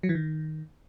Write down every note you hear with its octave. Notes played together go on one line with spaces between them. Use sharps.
F#3
E3
D#3